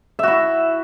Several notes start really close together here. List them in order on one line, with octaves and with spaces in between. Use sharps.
E5 F#4 E4